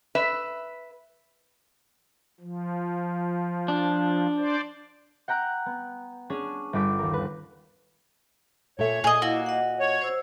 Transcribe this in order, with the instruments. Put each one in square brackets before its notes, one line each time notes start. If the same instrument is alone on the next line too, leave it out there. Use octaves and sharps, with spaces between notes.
[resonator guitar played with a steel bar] B4 E5
[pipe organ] F3
[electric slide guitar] D4
[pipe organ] C5 D5
[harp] F#5 G5 A#5 F#6 D7
B3
C#4 D4 G#4
G1 G5 D6 B6
D#2 A#4
B4
[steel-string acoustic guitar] A#2 A4 E5 [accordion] C#5
[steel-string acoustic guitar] A#2 [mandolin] G#4 D#5
[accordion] A#3 [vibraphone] E4 D#5 [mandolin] F#4
[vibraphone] D#5 F#5
[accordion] C#5
[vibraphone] C5 E6